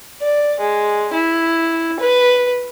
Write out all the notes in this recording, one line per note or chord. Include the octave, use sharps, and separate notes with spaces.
D5
G#3
E4
B4